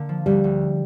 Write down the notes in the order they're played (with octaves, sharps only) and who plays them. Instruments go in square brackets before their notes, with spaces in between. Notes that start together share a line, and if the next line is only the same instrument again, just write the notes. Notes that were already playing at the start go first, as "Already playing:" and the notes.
Already playing: [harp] D3 A#3
F3
[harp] D2 [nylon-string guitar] G3
[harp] D2